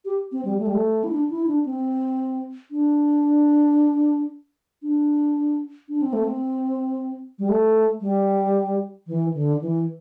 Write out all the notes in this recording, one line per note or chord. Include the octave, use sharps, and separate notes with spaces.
G4
C4
G3
A3
G3
A3
E4
D4
E4
D4
C4
D4
D4
D4
C4
A3
C4
G3
A3
G3
E3
D3
E3